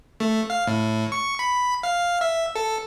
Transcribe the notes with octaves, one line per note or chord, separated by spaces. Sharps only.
A3
F5
A2
C#6
B5
F5
E5
A4